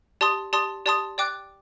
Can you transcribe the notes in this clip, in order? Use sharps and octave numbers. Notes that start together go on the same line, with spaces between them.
G4 D5 A5 C6 D#6
G4 D5 A5 C6 D#6
G4 D5 A5 C6 D#6
D5 G5 D6 F#6